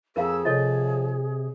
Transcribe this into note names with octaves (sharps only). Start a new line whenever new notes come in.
F2 G#4 A#4 F5 A#5 E6
C3 F3 A4 C#5 D#5